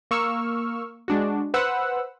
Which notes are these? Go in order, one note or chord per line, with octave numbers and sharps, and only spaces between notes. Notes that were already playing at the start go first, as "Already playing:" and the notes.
A#3 C#6 E6 F6
G#3 D4 F#4
B4 C5 F#5 E6